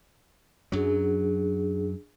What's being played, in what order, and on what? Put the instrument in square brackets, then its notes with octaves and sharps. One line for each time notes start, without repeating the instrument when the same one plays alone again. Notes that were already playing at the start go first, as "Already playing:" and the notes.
[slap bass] F#2 F#3 [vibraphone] D4 G#4